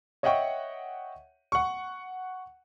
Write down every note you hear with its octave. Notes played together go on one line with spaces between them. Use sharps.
C#5 D#5 E5 F#5 G5 C#6
F#5 C#6